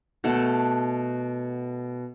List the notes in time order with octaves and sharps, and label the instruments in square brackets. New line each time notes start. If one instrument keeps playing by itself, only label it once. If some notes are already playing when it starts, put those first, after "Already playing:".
[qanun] B2 A3 F#5